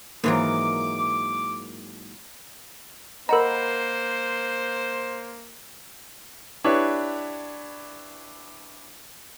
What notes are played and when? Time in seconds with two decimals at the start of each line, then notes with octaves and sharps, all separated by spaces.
0.24 G#2 E3 F#3 A#3 A#4 D6
3.29 A#3 A#4 C5 D#5 F#5 A#5 B5
6.64 D4 E4 G4 B4 C#5